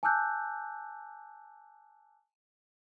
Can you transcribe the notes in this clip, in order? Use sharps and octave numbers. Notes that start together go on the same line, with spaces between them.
G#5 A5 D6 E6 F#6 G6